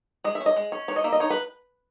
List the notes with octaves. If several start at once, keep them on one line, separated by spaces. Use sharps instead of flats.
G#3 D#5
E5
C#4
D#5
G#3
C#4
E3 C#5
D#5
A#3 E5
D#5
D#4 C#5
B4